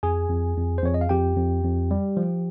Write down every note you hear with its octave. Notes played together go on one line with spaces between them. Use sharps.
F2 G#4 G#5
F2
F2
C5
F2 C#5
D#5
F5
F2 G4 G5
F2
F2
G3
F3